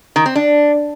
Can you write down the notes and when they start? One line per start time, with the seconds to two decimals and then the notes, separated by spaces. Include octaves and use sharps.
0.16 D#3
0.26 C4
0.35 D4